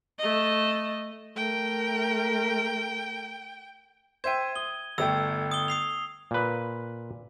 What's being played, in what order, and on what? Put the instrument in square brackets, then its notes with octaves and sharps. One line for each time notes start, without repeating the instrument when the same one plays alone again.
[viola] A3 D#5
[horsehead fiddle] A3 A#4 [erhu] G5
[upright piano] C5 E5 G5 [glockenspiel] G#6 D#7
[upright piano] D#6 [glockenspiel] G7
[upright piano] G1 A3 G5 [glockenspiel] E6
[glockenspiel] D#6 G7
D#6 C7 F7
[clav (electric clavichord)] A#2 B4